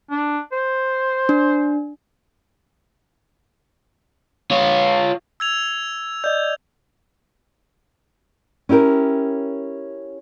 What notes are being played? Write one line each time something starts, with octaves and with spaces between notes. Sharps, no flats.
D4
C5
D4
F4 C#5
E6 G#6 F7
D5 D#5 G6
C#4 E4 G4 A#4